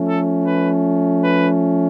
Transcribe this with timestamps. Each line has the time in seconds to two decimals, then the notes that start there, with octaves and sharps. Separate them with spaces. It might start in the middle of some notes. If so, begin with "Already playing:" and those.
Already playing: F3 A3 C#4
0.08 A4
0.47 B4
1.24 B4